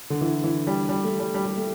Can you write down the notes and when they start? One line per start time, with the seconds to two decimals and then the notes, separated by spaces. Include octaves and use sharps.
0.10 D3
0.21 E3
0.44 E3
0.67 G3
0.89 G3
1.04 A3
1.20 G3
1.34 G3
1.45 G3
1.57 A3